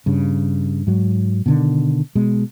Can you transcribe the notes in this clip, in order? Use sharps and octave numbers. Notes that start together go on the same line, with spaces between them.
G2 C#3
G#2 F#3
B2 D3 D#3
B2 G#3